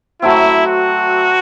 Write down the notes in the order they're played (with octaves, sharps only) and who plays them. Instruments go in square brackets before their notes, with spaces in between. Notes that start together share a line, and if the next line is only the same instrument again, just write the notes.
[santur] F#3 A3 C4 [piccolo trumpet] E4
[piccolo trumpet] F#4